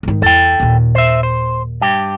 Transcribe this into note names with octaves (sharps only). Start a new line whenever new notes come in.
G#2 D#3
E2 A4 G5
D#2 A#2
C5 E5
C5
G2 G4